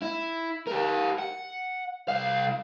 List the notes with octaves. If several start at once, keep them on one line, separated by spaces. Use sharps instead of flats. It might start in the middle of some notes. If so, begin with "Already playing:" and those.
E4
G4 A#4
F#5
C2 F5